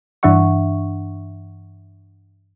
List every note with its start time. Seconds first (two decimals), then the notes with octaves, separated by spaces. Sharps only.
0.23 G2 E3 D4 E5 F#5 C#6